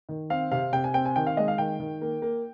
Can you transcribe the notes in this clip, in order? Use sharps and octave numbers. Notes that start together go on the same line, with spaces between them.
D#3
C4 F5
C3 F5
C3 G5
G#5
C4 G5
G#5
D#3 G5
F5
G#3 D#5
F5
D#3 G5
D#3
A#3
A#3